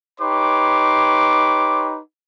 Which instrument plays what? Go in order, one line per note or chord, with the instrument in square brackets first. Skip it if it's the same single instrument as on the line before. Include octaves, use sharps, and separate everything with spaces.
[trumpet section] D#4 G4 B4 C#5 C6 D6